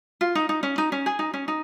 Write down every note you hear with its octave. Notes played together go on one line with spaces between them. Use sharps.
F4
D#4
D#4
C#4
D#4
C#4
G#4
D#4
C#4
D#4